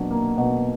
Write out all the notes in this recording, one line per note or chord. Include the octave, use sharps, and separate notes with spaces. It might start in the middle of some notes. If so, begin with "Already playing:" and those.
Already playing: B2 F#3 A#3 D4
A#3
B2